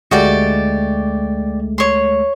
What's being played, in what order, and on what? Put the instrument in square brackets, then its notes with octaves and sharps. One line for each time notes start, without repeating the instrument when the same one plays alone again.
[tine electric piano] D2 G#3 A3 [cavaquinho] F#4 G4 D5
[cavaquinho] C#5 C6